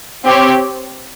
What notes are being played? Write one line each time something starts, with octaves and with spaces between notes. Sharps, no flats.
C4 G4 C#5